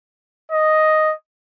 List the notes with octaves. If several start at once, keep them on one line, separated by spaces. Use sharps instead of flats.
D#5